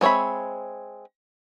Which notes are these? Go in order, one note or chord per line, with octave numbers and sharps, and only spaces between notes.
G#3 C4 C#5 E5 B5